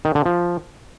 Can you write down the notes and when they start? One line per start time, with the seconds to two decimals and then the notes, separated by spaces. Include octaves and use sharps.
0.05 D#3
0.15 D3
0.26 F3